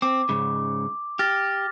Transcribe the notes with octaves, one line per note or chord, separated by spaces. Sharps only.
C4 D6
C#2 G#2 C#3
G4 F6 A6 A#6